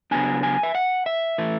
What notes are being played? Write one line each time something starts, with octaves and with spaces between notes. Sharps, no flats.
C#3 F#3 B3 D4 G#5
G#5
E5
F#5
E5
E3 A3